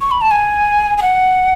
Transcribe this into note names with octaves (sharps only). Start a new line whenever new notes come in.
C#6
B5
A5
G#5
G#5
F#5